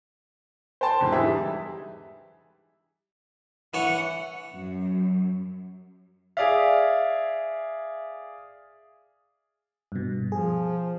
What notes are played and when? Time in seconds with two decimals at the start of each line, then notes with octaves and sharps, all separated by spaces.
0.81 C5 G5 A5 C6
1.00 E2 G#2 D3
1.12 E3 D#4 G4 G#4 E5
1.24 G3
3.74 E3 C#5 F#5
4.53 F#2
6.37 G#4 D5 E5 F5
9.92 G2 B2
10.32 F3 G#4